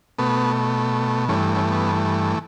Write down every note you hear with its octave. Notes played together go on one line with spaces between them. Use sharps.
B2 A3 B3
G2 E3 A3 C#4
C#4
B3